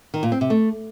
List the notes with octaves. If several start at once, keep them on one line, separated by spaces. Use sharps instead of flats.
D#3
A#2
C4
C3
A3